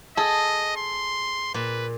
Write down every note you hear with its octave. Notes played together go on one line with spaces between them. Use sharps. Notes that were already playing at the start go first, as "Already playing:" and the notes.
G#4 A4 D#5
C6
A#2 B4